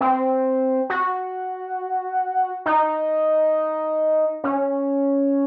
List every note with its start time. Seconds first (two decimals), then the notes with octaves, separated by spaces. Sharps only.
0.01 C4
0.90 F#4
2.66 D#4
4.44 C#4